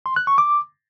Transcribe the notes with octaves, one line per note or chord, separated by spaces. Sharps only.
C6
F#6
C#6
D6